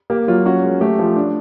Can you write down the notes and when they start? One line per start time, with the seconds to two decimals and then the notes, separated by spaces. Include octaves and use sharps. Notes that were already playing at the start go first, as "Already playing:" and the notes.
0.10 A#3 G4
0.28 F#3 F4
0.46 C#4 F#4
0.64 G#3
0.81 A3 G4
0.99 F3
1.16 D4